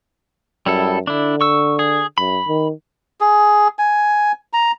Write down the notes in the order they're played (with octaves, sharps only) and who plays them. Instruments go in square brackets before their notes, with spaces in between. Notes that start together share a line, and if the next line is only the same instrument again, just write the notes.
[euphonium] F#2 [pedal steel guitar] G3 E4 A4
[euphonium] D3 [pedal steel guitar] D4 E4
[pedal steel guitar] C#6 E6
G#4
[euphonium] F#2 [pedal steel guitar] B5
[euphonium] D#3
[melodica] G#4
G#5
A#5